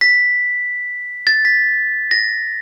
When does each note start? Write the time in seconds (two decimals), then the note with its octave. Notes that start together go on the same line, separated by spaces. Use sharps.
0.01 B6
1.27 A6
1.45 B6
2.11 A#6